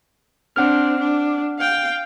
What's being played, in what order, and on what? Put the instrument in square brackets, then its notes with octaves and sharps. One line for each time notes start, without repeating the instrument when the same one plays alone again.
[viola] C4 D4 [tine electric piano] F#5 F6
[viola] D4
F5 G5